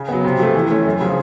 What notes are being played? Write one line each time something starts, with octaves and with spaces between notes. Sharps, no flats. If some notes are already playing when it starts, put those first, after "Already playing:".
Already playing: C#3
F#3 B3
C3
F3 A3
E3
A3 C#4
F#2
C#3 F3